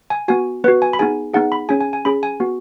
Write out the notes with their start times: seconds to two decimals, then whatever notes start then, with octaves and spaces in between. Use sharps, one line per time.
0.10 G#5
0.28 B3 F#4 G#5
0.64 B3 F#4 B4
0.82 G#5
0.93 B5
0.99 B3 D#4 G#4 G#5
1.34 B3 D#4 G#4 F#5
1.52 B5
1.69 C#4 G#4 G#5
1.81 G#5
1.93 G#5
2.05 C#4 G#4 B5
2.23 G#5
2.40 B3 F#4